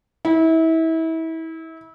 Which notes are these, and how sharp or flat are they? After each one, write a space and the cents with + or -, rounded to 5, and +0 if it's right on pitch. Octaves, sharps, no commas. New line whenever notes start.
E4 -30